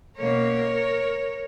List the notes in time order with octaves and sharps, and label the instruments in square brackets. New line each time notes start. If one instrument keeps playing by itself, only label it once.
[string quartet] B2 A#3 C#4 A#4 C#5